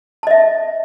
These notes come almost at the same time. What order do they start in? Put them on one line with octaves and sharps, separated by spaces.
A5 D#5 E5